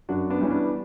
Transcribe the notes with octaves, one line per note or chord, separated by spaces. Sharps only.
F#2 D4 F#4
B3 D4
E3 G3 C#4
B3 D4